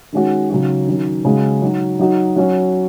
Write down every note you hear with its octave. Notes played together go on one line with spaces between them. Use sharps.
D#3 G#3 C#4 F#4
C#3 F#3 D#4 F#4
D#3 F#3 C#4
C#3 G#3 F#4
F#3 D#4 F#4
F#3 D#4 F#4
F#3 C#4 F#4